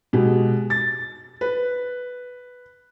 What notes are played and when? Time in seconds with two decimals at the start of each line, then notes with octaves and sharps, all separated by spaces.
0.13 B2 G#3 G4
0.70 A6
1.41 B4